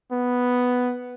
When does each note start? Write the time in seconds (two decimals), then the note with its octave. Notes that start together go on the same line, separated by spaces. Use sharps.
0.12 B3